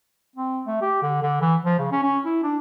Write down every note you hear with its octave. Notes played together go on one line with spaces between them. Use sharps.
C4
A3
G4
D3
D3
E3
F3
C#3
C#4
C#4
E4
D4